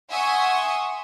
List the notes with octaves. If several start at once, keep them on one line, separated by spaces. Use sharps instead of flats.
E5 F#5 G#5 C6 C#6 D#6